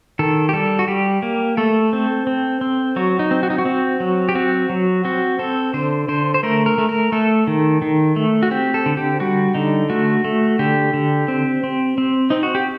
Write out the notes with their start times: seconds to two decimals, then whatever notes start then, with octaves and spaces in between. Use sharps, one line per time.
0.19 D#3 A4
0.49 G4
0.53 G3 A4
0.79 F#4
0.88 G3 G4
1.22 A#3
1.57 A3 A4
1.93 C4
2.27 C4
2.61 C4
2.96 F#3 F#4
3.19 D#4
3.31 C4
3.43 F#4
3.50 D#4
3.58 F#4
3.65 C4
4.00 F#3
4.29 G4
4.35 C4 F#4
4.70 F#3
5.05 C4 F#4
5.39 C4 A4
5.74 D3 C5
6.08 D3 C5
6.34 C5
6.43 A3 A#4
6.66 A#4
6.78 A3
6.89 A#4
7.12 A3 A4
7.47 D#3
7.82 D#3
8.16 A3
8.43 F#4
8.51 C4 G4
8.74 A4
8.86 D3
8.97 G4
9.20 G3 F#4
9.55 D3 D#4
9.90 A3 F#4
10.24 A3
10.59 D3 G4
10.94 D3
11.28 C4
11.64 C4
11.98 C4
12.30 C4 D#4
12.43 F#4
12.55 G4